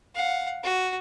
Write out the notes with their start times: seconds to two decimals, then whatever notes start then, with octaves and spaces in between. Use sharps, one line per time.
0.14 F5 F#5
0.63 F#4